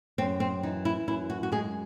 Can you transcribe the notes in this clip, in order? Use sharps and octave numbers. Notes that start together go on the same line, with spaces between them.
F#2 C4
C4
E3 D#4
E4
F#2 E4
F#4
F#4
G#3 G#4